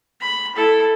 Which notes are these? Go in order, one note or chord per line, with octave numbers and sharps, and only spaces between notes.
B5
E4 A4